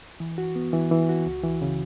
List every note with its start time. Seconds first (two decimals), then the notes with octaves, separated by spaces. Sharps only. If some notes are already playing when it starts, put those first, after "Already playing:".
0.20 E3
0.38 F#4
0.56 B3
0.73 E3
0.91 E3
1.09 F#4
1.26 C#2
1.44 E3
1.62 C#3